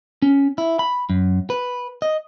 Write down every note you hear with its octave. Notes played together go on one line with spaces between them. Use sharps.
C#4
E4
B5
F#2
B4
D#5